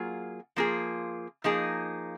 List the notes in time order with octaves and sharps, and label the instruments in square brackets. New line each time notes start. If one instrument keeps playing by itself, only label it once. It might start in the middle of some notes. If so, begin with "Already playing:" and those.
Already playing: [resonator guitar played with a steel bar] F#3 A#3 F4 G#4
F3 A#3 F4 G#4
F3 A#3 D#4 G#4